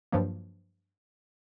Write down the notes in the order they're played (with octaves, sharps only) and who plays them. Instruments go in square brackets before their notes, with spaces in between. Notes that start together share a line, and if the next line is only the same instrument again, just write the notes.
[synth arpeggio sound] G2 F3 F#3 A#3